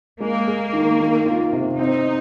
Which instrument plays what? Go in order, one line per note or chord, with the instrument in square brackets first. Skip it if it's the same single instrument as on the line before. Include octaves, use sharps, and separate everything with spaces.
[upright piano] G#3 [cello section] A#3
[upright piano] G#4
D#3
D#3
F4
C3
[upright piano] C4 [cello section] D#4